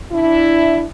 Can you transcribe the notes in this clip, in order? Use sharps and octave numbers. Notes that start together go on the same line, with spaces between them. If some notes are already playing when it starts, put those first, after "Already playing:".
D4 E4